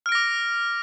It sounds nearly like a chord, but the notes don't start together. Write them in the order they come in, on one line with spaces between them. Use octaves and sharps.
F6 D7 A#6 D6